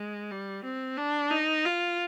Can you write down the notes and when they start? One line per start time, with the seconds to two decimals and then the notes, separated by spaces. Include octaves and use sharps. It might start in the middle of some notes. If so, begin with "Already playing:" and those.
Already playing: G#3
0.31 G3
0.64 C4
0.97 D4
1.31 D#4
1.65 F4